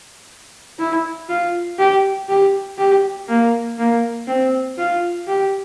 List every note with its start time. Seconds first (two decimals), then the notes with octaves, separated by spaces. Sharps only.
0.79 E4
1.29 F4
1.78 G4
2.29 G4
2.78 G4
3.28 A#3
3.78 A#3
4.27 C4
4.78 F4
5.27 G4